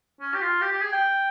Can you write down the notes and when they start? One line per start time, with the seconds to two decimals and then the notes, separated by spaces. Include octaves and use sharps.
0.21 C#4
0.34 G4
0.41 F4
0.61 G4
0.72 G4
0.82 G#4
0.92 G5